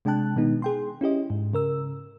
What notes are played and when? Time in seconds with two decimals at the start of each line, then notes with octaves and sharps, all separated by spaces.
0.05 C3 G#3 D4 G5 A5 F#6
0.36 B2 D#3 G#3 B3 D#4
0.62 G#4 G5 C6
1.01 C#4 E4 G4 D#5
1.30 G#2
1.53 C#3 A#4 E6